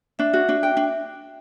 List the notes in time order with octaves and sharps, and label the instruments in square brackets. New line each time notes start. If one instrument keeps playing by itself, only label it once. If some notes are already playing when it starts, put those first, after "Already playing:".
[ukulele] D4 [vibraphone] E5
[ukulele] F#4
D4
G5
D4